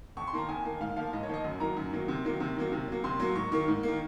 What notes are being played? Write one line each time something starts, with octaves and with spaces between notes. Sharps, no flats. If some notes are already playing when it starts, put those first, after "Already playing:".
F2 C#6
C6
D#3 A#3 A#5
F2 G#5
D#3 A#3
G#2 F5
F3 A#3 F5
G#2 D#5
C#5
F3 A#3 D#5
F#2
D#3 F#3 A#3 A#5
F#2
D#3 F#3 A#3
C3
D#3 F#3 A#3
C3
D#3 F#3 A#3
C3
F#3 A#3
C3 C6
F#3 A#3
G#2 C#6
D#3 A#3 C#6
G#2
D#3 A#3